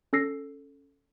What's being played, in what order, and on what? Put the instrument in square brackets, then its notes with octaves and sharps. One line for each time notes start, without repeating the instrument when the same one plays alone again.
[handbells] C#4 A4 E6 A#6 C7